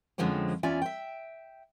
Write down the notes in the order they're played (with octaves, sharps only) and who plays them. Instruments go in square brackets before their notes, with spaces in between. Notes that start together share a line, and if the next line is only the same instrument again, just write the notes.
[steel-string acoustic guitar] F2 D3 F3 G#3 C4 C#4
E2 C#4 F4 D5 E5 G#5
E5 G5